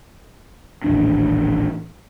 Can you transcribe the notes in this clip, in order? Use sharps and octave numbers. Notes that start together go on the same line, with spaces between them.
D#1 A1 D#2 D4